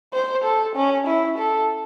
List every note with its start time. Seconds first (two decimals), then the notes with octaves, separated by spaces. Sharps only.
0.13 C5
0.44 A4
0.76 C#4
1.07 E4
1.38 A4